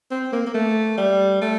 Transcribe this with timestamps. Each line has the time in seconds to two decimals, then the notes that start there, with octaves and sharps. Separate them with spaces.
0.11 C4
0.32 A#3
0.46 A#3
0.54 A3
0.98 G3
1.41 A3